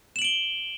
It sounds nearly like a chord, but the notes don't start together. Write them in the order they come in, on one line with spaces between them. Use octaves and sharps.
E7 F#7 D7 G7